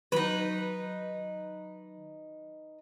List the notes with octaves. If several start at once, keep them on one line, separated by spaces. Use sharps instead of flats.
D#3 F#3 D#4 B4